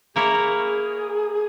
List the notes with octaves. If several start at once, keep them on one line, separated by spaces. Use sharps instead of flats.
A#3 E4 G#4 A#4 C#5